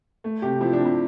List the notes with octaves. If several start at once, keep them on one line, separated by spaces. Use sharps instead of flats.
A3
C3 G4
F3 E4
D4
C3
E4